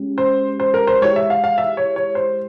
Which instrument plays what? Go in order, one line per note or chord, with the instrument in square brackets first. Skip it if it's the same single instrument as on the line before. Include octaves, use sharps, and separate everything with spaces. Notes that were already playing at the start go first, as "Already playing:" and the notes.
Already playing: [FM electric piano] G#3 C#4 G4
[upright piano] C5
C5
A#4
C5
[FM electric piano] G#3 E4 G4 [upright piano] C#5
[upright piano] E5
F5
F5
E5
C#5
C#5
C5